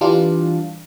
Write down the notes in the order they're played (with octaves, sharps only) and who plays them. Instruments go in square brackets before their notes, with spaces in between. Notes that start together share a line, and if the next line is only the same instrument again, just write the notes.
[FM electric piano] E3 G3 D4 F4